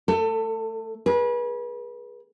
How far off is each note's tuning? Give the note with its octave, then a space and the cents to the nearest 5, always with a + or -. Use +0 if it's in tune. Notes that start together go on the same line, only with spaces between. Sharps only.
A3 +0 A4 +30 E5 +5
G#4 +5 B4 -35